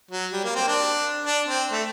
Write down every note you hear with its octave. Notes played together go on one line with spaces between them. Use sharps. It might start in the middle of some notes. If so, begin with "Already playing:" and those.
F#3
G3
A#3
C4
D4
D4
C4
A3